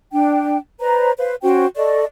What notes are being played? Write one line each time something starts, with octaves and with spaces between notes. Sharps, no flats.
D4 G5
B4 C5 D5 A#5
B4 C5 F5
C#4 F#4 C5 G5
A4 D5 D#5 C#6